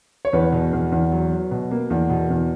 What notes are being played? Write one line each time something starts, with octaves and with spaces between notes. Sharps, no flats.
C#5
E2 B4
B2
E2
E2
F#3
F#3
B2
A#3
E2
B2
E2